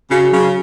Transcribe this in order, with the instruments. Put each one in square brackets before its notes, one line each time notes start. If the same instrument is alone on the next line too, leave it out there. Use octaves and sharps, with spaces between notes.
[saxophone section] C#3 [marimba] F#4
[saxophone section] C#3 [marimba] F#3